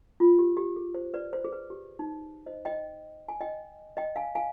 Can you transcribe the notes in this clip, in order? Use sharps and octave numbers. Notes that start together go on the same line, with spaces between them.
F4
G4
G4
G#4
C5
B4 D5
C5
G#4
B4
G4
D#4
C5 D#5
D#5 G5
G#5
D#5 G5
D#5 G5
F5 G#5
F5 G#5